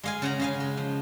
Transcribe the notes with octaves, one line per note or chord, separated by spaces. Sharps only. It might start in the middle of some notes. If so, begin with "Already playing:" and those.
G#3 F5 G#5
C#3 F#5 A#5
C#3 F5 G#5
G#3
F3